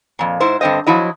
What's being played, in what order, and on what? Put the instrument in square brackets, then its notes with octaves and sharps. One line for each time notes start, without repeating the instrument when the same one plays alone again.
[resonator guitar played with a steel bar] F2 A#2
G#2 E4 C5
G2 D3 C4 C5 D#5
F3 F#3 E4 D#5